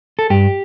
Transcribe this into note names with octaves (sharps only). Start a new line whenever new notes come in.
A4
G2 G4